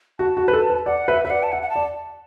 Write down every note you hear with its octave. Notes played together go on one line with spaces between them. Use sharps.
F#4 A5
F#4
B4
A4
B4
D5 F#5
B4 E5
B4 E5
D5 F#5
A5
E5 F#5
F#5
A5
D5